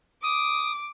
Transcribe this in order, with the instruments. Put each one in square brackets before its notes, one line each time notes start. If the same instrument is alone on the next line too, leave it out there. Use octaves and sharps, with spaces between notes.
[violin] D6 [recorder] D#6